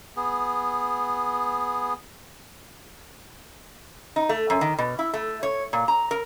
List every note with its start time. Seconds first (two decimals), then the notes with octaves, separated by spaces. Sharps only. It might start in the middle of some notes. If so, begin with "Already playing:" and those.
0.16 B3 G#4
4.16 D#4
4.29 A3
4.50 F#2
4.61 D#3
4.78 B2
4.99 E4
5.14 A3
5.43 C#5
5.73 A#2
5.88 A#5
6.11 A#4